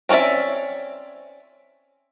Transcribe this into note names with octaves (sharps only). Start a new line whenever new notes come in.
C4 C#4 F4 D5 E5